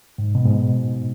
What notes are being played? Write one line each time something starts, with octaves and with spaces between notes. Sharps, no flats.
G#2
B2
G#2
B2